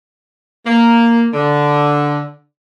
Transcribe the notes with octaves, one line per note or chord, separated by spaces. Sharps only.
A#3
D3